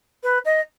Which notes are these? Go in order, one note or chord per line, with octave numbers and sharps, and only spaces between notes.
B4
D#5